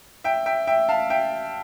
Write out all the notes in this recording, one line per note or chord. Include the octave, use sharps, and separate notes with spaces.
E5 G5
E5 G5
E5 G5
F5 A5
E5 G5